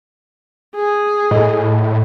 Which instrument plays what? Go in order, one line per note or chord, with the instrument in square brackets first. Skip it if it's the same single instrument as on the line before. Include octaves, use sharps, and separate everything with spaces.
[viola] G#4
[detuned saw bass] A2 [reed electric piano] A4 D#5